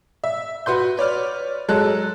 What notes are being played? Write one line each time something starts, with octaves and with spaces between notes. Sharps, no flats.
E5
F#4 B4 C6 G6
B4 C#5 D5 F6
F#3 G#3 A4 F#6